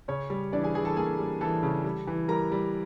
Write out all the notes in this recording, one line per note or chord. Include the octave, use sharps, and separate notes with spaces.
C#3 C#4 C#5
G3
E3 D4 D5
G#4 G#5
E3 G#4 G#5
A4 A5
A#3 G#4 G#5
G3
E3 A4 A5
C#3
G3
E3
G3 A#4 A#5
G3